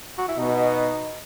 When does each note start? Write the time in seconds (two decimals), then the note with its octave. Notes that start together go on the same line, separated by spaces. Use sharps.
0.18 F#4
0.28 E4
0.38 B2 D#4